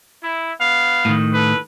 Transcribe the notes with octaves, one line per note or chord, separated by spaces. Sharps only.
E4
B3 F5
A2 D#3
A4 B4